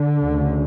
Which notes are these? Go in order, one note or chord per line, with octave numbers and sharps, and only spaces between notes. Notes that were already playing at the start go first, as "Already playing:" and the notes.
Already playing: D3
D2 C#3